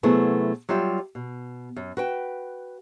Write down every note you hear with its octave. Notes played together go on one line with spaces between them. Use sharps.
C3 F#3 A3 B3 E4 G#4
F#3 G3 F4 G4 E5
B2
F#2
F#4 B4 G5